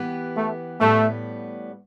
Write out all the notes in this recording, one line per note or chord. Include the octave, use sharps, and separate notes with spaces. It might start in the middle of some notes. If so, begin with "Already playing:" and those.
Already playing: E3 B3 G4
A3
A2 G3 A3 B3